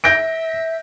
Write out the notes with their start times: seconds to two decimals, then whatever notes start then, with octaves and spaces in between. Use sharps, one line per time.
0.04 E5 G6 A#6 D7